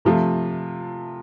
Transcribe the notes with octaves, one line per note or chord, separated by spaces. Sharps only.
C3 F3 A3 F4